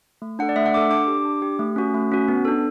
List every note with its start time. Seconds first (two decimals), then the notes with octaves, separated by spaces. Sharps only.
0.22 A3
0.39 D4 A4 F#5
0.49 D5
0.56 A3 E5
0.66 F#5
0.74 D4 D6
0.77 A4
0.90 D4 D6
1.07 G4
1.25 D4
1.42 G4
1.59 A3
1.76 C#4 F#4
1.94 A3
2.12 C#4 F#4
2.28 B3
2.45 D4 A4